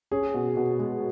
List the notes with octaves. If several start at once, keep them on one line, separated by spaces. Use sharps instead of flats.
C#4 G#4
B2
B2
G#3